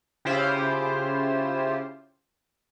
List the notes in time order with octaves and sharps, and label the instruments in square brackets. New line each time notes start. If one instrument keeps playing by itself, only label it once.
[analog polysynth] C#3 E4 F4 G4 C5